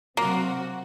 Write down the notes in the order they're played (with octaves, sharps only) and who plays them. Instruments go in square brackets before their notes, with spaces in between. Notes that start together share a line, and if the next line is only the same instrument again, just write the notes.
[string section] C3 F#3 C4 F#4 [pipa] A#3